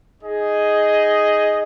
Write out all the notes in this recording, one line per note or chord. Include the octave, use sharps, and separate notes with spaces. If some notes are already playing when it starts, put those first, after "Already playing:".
D#4 G#4 D#5